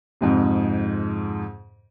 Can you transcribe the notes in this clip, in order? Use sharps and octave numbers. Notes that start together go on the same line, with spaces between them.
F2 G#2 C3